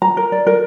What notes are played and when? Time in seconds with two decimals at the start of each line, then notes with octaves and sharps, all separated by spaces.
0.02 A#5
0.17 A#4
0.32 D5
0.47 A#4